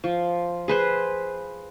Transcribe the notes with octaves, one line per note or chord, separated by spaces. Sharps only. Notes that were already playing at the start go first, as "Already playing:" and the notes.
F3
G#4 B4 C5